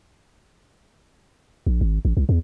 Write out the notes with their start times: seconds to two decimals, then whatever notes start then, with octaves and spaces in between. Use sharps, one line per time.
1.67 A#1
1.81 G#1
2.05 A1
2.17 C2
2.29 E2